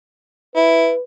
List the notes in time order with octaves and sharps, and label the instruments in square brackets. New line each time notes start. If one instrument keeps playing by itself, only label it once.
[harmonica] E4 [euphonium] B4